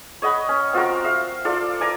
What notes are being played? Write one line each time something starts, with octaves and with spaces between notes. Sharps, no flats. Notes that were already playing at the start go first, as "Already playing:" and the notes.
C#5 D#5 F#5 B5
C#4
C4 F4 F#4 A#4
E5 F5
F4 A4 D5 C6
D5 G#5 A#5 D6